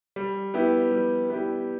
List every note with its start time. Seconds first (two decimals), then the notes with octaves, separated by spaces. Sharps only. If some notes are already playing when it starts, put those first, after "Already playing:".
0.16 G3
0.54 B3 E4 G4
0.92 G3
1.30 B3 E4 G4